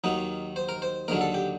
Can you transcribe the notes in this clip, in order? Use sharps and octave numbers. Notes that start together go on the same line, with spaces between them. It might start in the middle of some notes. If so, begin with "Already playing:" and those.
D#2 D#3 F#3 D#4
C5
A#4
C5
D#2 D3 F#3 A#4
A4
G4